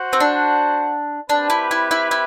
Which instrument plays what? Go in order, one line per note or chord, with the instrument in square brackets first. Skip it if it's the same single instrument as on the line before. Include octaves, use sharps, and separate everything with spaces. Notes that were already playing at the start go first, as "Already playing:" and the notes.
Already playing: [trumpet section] F#4 C5 F#5
[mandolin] C4
D4
[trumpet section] C4 G4 B4 [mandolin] D4
[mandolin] E4
E4
E4
E4